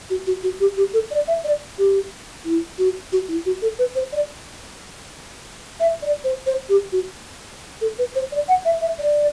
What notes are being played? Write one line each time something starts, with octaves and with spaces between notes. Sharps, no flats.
F#4
F#4
F#4
G4
G4
A4
D5
E5
D5
G4
E4
F#4
F#4
E4
F#4
A4
B4
C5
D5
E5
D5
C5
C5
G4
F#4
A4
B4
C5
D5
F#5
E5
E5
D5